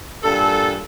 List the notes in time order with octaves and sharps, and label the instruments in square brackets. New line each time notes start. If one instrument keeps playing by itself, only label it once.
[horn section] G2 A#2 A4